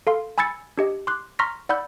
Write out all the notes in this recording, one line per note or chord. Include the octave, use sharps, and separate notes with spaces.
A4 F5 C6
G#5 B5 E6 G#6 A6 C#7
D4 G4 D#5
C6 D6 F#6
A#5 C6 C#6 F6 A#6 B6
D5 F#5 B5 E6 G6